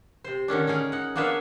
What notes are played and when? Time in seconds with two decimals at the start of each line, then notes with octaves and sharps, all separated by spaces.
0.24 C3 C5
0.48 D3 D#3 C#4 D4
0.67 C#4 D#4 G#4 A#4
0.92 D#4 F#5
1.15 A#3 B3 D4 C#5 E5 F5